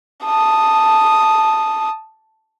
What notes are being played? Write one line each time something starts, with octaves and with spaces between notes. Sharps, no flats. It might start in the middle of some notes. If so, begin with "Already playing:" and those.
A5 D#6